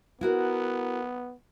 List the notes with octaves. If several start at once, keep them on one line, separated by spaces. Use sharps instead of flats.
B3 E4 F#4 A#4